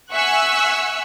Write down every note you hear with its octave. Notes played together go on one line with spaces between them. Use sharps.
E5 F#5 G#5 C#6 E6 F#6